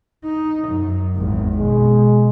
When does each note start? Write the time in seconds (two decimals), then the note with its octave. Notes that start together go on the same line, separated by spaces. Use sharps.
0.24 D#4
0.68 F#2
1.16 G#1 E2
1.58 B2 G#3